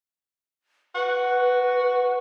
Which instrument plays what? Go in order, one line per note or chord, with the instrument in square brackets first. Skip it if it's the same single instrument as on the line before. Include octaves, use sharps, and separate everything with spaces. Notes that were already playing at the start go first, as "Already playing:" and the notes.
[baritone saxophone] F#4 [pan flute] B4